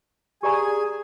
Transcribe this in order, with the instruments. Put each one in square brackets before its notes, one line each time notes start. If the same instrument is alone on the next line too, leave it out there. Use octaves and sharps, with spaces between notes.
[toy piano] G4 D5 A#5 [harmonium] G#4 G#5